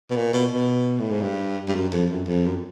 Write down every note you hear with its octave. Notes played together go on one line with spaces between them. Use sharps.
B2
A#2
B2
B2
A2
G#2
G2
G2
F#2
F2
F#2
F2
F#2